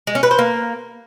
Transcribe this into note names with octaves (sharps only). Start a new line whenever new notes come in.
G#3
C#4
B4
C5
A#3